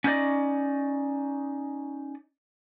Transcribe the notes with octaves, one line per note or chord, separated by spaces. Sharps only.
C#4 D#4 G4 C5 D5 D#5